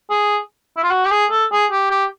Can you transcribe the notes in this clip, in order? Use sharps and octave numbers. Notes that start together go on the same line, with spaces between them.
G#4
E4
F4
F#4
G4
G#4
A4
G#4
G4
G4